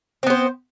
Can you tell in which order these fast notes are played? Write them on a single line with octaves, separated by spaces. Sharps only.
C4 B3 C5